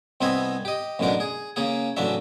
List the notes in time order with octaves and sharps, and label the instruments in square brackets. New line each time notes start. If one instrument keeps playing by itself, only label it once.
[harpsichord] C2 B3 C4 D#5 E5 G#5
G4 D#5
A1 F#2 B2 D3 D4 A#4
G#4
C#3 A#3 G#4
A1 C#3 F#3 D4 E5